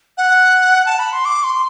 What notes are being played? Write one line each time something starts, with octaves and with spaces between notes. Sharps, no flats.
F#5
A5
B5
C6
D6
C6